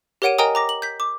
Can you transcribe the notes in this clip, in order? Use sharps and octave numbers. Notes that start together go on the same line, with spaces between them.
G4 A#4 C#5 F#5 D7 D#7
A#4 D#5 G5 G#5 A#5 D#6
A#5 D6 A#6
F#7
G6 B6
D6